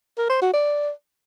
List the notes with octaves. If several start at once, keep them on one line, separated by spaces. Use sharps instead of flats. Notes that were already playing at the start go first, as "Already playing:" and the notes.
A#4
C5
F#4
D5